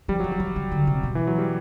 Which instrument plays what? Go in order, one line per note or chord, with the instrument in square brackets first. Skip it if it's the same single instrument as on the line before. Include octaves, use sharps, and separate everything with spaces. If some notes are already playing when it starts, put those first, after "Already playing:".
[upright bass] F3 [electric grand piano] G3
[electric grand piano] F#3
[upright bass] E3
[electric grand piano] F#3
[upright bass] E3
D#3
D3
C3
B2
[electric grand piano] E3
F#3
G3